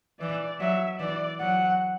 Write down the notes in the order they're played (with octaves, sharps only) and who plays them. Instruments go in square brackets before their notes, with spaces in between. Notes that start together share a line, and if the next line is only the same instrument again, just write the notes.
[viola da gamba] E3 [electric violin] D5
[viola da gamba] F#3 [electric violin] E5
[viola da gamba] E3 [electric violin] D5
[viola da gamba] F#3 [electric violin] F#5